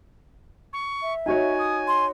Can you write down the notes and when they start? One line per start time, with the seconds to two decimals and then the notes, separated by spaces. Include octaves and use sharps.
0.73 C#6
1.02 E5
1.26 D#4 F#4 C#5 G#5
1.59 D#6
1.87 C6